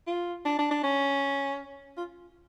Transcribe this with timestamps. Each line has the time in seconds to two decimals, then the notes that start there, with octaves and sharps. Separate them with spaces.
0.07 F4
0.45 D4
0.59 D4
0.71 D4
0.83 C#4
1.97 F4